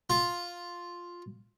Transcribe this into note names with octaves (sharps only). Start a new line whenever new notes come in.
F4